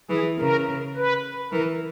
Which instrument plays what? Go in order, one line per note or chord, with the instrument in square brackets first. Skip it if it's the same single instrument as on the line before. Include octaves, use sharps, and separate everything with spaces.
[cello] E3 [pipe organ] G#4
[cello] C#3 [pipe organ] A#4
[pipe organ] B4
[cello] E3 [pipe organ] A#4